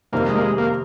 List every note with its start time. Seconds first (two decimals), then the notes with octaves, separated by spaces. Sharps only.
0.12 F2 C3 D#3 G3 A#3 C4
0.28 G#3
0.35 A#3
0.42 G#3
0.58 A#3